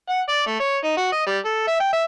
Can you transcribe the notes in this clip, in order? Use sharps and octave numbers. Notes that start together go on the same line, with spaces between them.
F#5
D5
A3
C#5
D#4
F#4
D#5
G3
A4
E5
G5
E5